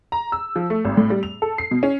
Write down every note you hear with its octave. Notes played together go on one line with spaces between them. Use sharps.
A#5
E6
F3
A3
G#1
A2
G3
F7
A4
C7
B2
C#4